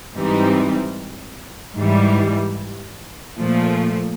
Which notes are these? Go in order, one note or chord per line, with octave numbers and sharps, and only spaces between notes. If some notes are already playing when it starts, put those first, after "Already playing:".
G#2 E3 G3 C4 D#4
G#2 E3 G3
A#2 F3 A3